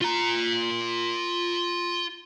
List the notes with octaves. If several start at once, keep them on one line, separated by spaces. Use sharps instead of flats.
F4 A#5